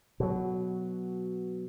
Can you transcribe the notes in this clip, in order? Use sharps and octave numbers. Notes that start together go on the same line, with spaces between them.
B2 F#3